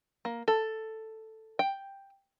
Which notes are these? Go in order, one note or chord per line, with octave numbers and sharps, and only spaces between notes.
A#3
A4
G5